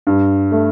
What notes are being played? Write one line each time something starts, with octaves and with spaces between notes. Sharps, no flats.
G2
A3